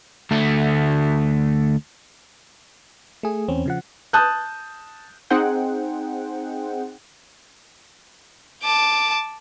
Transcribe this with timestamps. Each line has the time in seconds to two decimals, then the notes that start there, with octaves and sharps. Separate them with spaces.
0.31 D2 A3
3.23 A3 G#4
3.48 E2 C4 C#4
3.66 C#3 F3 F#5
4.13 A5 D#6 F#6 G6
5.30 C4 D#4 G#4 C5 F#5 G5
8.64 A5 D6